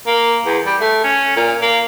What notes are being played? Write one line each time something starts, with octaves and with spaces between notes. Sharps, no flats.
A#3
E2
G3
A3
C#4
A#2
A#3